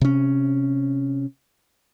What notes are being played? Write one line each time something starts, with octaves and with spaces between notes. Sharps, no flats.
C3 C#4